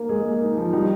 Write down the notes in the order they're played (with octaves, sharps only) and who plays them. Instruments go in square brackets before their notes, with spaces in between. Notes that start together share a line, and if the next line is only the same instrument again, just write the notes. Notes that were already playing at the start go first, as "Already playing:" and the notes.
Already playing: [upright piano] A#3
[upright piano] G#3 [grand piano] G#4
[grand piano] A#3
D#4
F3
[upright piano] G3 [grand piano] D#4